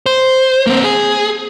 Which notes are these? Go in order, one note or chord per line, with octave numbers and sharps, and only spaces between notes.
C5
A#3 C4
G#4